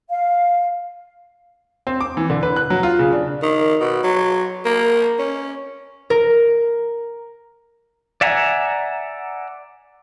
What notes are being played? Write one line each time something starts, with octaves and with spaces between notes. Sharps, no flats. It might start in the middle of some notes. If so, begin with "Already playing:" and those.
F5
C4
D6
E3
D3
B4
F#6
F#3
F4
C#3
D4
D#3
B2
F#3
A#3
C#4
A#4
D5 E5 F#5 G#5 A#5